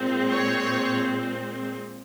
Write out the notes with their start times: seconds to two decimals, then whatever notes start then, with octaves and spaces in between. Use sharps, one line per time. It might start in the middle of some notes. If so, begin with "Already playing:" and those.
Already playing: A#2 G#3 C4
0.29 C#5